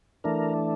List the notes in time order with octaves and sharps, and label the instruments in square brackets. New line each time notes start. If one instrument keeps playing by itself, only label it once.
[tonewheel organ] E3 A3 D4 A#4